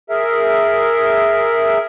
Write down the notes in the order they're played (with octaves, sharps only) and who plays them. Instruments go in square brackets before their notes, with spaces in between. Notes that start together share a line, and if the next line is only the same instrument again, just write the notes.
[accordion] G#4 A#4 E5